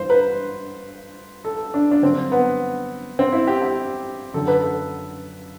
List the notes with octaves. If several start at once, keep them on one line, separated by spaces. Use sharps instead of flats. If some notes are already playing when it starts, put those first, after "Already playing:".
Already playing: G2 E3 C5
B4
A4
D4
D4
G2 D3 F#3 C4
B3
C4
E4
G4
G4
F#2 D3 F#3 A4
B4
A4